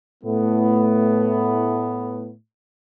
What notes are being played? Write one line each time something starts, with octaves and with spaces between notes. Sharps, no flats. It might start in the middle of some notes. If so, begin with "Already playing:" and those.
A2 A3 B3